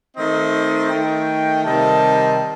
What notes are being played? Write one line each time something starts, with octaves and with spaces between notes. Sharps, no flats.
D#3 A3 C4 D#4 D#5
D#5
D#3 A3 D#4 G5
C3 D#3 G3 C4 D#4 A5